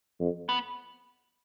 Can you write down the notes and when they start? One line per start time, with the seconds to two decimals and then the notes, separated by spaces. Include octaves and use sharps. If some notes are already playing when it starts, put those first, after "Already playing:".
0.20 F2
0.49 B3